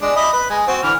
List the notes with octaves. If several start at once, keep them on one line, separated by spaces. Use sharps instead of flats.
G#3 D4
D#5 E5 B5
B4 B5
G#3 G#5
C4 F#4
D3 E3 F6